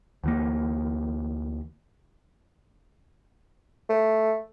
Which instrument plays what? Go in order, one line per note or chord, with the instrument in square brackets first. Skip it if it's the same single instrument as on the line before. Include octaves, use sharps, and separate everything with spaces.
[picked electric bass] D2 E3 A#3
[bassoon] A3